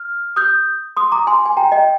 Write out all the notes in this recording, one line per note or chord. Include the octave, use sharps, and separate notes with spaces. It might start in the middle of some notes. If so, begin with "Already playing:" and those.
Already playing: F6
D#6 G6
C6 D#6
A#5 D6
G#5 C6
G#5
G5 A#5
D#5 G5